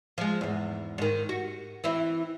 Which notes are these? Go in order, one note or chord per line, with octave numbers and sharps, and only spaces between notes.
F3 G#3
E2 G#2
G#2 D#3
F#4
E3 C4 E4